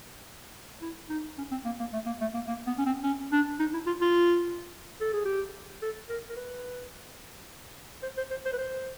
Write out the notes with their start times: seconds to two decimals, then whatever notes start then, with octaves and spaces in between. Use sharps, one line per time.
0.81 E4
1.09 D#4
1.38 C#4
1.51 C4
1.65 A#3
1.79 A#3
1.93 A3
2.06 A#3
2.21 A3
2.34 A#3
2.47 A#3
2.66 B3
2.78 C#4
2.86 C4
3.03 C#4
3.32 D4
3.59 D#4
3.73 E4
3.86 F4
4.01 F4
5.01 A4
5.13 G#4
5.25 G4
5.82 A4
6.09 A#4
6.29 A#4
6.36 B4
8.02 C5
8.17 C5
8.30 C5
8.45 C5
8.53 B4
8.58 C5